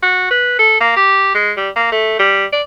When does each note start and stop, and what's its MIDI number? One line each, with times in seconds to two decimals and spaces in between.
0.03 0.30 66
0.31 0.54 71
0.59 0.80 69
0.80 0.93 58
0.96 1.32 67
1.35 1.52 56
1.57 1.70 55
1.76 1.89 58
1.92 2.17 57
2.19 2.45 55
2.52 2.62 74